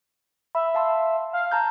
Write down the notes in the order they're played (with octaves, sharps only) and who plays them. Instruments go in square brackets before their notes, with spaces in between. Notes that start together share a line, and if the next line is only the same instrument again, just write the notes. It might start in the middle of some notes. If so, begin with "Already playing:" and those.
[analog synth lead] E5 [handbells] B5
[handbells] F5 A5 C6
[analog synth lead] F5
[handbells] A5 A#5 G6